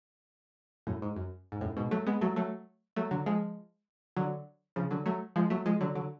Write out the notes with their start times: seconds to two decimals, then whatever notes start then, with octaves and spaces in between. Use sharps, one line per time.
0.87 F#2 A2
1.02 G#2
1.16 F#2
1.52 G#2
1.61 F#2 A2
1.77 G#2 B2
1.91 F#3 A3
2.06 G#3 B3
2.21 F#3 A3
2.36 F#3 A3
2.96 F#3 A3
3.11 D3 F#3
3.26 F3 G#3
4.17 D3 F#3
4.76 C#3 F3
4.91 D3 F#3
5.06 F#3 A3
5.36 F3 G#3
5.50 F#3 A3
5.66 F3 G#3
5.81 D3 F#3
5.95 D3 F#3